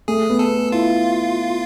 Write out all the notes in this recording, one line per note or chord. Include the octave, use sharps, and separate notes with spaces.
A3 G#4
B3
A4
E4 F4